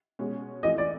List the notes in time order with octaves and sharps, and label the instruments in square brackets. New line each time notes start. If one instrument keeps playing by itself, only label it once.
[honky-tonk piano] B2 G#3 C#4
[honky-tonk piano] E3 A3 C4 F4 [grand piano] D#5
[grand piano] D5